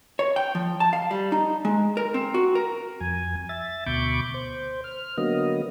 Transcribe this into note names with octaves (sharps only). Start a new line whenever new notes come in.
C#5
G5
F3
A5
F5
G3
D#4
G#3
A#4
C4
F#4
A#4
F2 G#5
E5 A6
D2 B2 B5 C#6 D6 G6
C5
F6
D3 F#3 A#3 B3 D#5